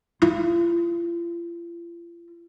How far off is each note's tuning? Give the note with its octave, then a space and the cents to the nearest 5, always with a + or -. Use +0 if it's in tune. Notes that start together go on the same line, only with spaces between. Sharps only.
F4 -40